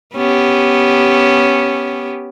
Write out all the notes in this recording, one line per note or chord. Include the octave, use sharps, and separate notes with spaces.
B3 C#4 G4